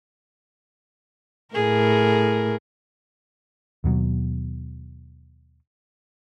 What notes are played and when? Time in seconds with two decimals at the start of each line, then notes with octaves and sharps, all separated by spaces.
1.55 A2 G#4 A#4
3.84 D#2 B2 F#3